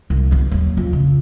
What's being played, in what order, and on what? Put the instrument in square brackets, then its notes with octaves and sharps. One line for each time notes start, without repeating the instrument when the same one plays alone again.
[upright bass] C2
D3 B3
D#2 F#3
F2
C#3